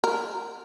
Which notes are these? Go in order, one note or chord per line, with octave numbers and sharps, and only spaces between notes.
A#4